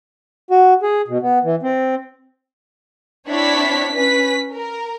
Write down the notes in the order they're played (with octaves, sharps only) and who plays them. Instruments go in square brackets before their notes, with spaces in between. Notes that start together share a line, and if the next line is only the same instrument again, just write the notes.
[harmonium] F#4
G#4
B2
B3
E3
C4
[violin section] C4 D4 E4 C#5 B6
C#4 B4 B6
A#4